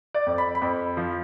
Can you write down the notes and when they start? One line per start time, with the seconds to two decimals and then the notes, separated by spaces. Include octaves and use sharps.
0.14 D5
0.26 F2
0.38 B5
0.55 B5
0.62 F2
0.97 F3